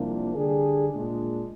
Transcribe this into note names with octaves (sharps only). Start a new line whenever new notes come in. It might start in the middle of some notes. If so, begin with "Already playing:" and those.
Already playing: C2 C3 F3 A#3 D4
D3 G3 D4 G#4
A#2 G#3 D4